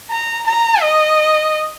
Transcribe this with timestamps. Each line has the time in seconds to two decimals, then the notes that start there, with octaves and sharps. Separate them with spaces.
0.11 A#5
0.46 A#5
0.82 D#5